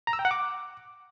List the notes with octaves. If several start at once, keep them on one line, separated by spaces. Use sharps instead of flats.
A#5
E6
G5
F#5
D6